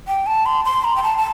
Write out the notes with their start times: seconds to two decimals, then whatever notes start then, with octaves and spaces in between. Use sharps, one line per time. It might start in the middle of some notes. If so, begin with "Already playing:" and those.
0.07 G5
0.26 A5
0.46 C6
0.65 C6
0.84 A#5
0.96 G5
1.03 A5
1.17 A5